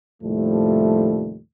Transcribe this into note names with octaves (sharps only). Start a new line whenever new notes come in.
D#2 A2 C3 F3 G3 A3